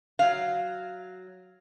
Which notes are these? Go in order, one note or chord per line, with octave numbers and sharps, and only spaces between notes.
F#3 F5